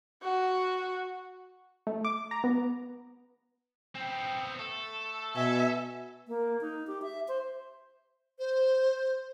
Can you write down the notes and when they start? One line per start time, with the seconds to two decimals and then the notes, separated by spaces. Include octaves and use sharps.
0.22 F#4
1.87 A3
2.05 D6
2.31 A#5
2.44 B3
3.95 B3 C4 G5
4.59 A3 A4
5.36 B2 E5 G#5
6.28 A#3
6.61 D#4
6.87 G4
7.02 E5
7.28 C5
8.39 C5